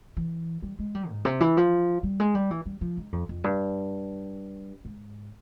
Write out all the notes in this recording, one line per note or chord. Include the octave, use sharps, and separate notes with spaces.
E3
G3
G#3
G3
G#2
C3
E3
F3
G3
G#3
G3
E3
G3
F3
G#2
F2
F2
G2
G#2